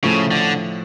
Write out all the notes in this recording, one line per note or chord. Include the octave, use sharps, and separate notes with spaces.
A2 C#3 F3 A3
D3